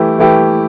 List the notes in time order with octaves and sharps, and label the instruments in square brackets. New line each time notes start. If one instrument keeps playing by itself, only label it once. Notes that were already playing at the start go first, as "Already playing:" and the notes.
Already playing: [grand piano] E3 A3 E4 G4
E3 A3 E4 G4